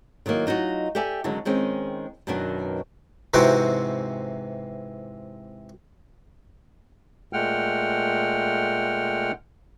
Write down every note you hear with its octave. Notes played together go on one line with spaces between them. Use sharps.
D3 D#3 F#3 A#3
F#3 D#4 F4 F#4
G4 A4 D5 E5 G#5
D3 D#3 F#3 G#3 C#4
D#3 G#3 C4 C#4
F#2 B2 D#3 F#3 B3 D4
G#2 C3 E3 C4 F#4 G5
A#2 G#3 A3 F#5 G5 F6